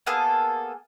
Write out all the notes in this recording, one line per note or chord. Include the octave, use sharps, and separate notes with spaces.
A#3 B3 G#4 A4